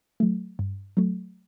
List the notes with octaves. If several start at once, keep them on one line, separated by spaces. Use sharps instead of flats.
F#3 A3
G2
F#3 A3